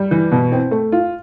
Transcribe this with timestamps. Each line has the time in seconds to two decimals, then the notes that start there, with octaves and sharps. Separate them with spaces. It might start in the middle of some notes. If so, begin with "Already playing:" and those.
Already playing: G3
0.11 E3
0.32 B2
0.52 C4
0.71 A3
0.92 F4